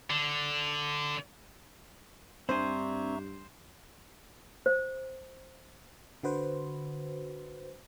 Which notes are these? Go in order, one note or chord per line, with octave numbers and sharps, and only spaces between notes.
D3
G2 C4 D4 C5 E5 G#5 A#5 C#6
C5
D3 F#4 B4 C5